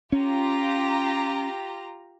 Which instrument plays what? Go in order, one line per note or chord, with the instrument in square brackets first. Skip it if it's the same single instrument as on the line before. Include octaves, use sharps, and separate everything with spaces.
[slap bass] C#4 [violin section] F4 G4 A#5